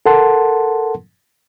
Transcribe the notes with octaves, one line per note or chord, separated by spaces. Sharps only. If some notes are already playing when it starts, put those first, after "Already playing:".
A4 A#4 F#5 A5 C6